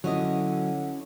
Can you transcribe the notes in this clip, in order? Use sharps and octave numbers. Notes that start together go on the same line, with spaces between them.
D3 F#3 C#4 E4 D#5